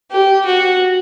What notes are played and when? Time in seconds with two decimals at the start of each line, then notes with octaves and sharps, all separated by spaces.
0.11 G4
0.46 F#4